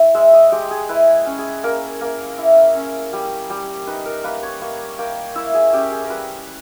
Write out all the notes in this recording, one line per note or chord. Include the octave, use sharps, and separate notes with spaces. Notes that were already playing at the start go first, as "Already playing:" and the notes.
Already playing: E4
G#3 E5
D#5
G#3 G4
G#4
E4 B4
C#4
G#4
A#3 A#4
A#3 A#4
E4
C#4
G3
G3
D#4 B4
A#4
A#3 B4
C#5
A#3 C#5
A#3 G5
E4 E5
G#4
C#4 G4
G#4
A#4
G3 B4